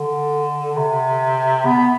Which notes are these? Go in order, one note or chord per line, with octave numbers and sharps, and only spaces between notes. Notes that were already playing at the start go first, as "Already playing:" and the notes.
Already playing: D3
C3
B3